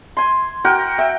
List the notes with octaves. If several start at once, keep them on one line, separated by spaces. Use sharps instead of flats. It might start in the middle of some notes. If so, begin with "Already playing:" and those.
G#5 C6
F#4 A#4 G5
E5 G5